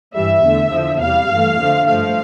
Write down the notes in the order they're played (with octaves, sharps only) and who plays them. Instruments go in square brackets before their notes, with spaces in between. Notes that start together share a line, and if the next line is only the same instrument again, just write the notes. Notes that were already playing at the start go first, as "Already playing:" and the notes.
[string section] G2 E3 G3 E5
E2 D3 A3
E2 D3 F3
E2 C3 G3 F5
G2 E3 A3
F2 D3 F3 A3
G2 F3 A3 F5